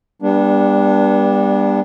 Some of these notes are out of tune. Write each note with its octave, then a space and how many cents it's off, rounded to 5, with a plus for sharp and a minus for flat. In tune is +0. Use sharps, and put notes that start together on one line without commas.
G3 +20 B3 -30 D4 +0